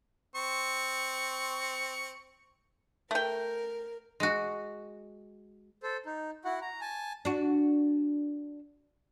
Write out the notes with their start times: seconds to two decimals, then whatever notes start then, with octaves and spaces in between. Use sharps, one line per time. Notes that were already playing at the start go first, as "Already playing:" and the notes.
0.35 C4 C#6
3.11 A3 A#4 G5
4.20 G#3 F#4
5.83 A4 C5
6.06 D#4
6.45 E4 F#4 F#5
6.61 A#5
6.81 G#5 A5
7.25 D4 F#4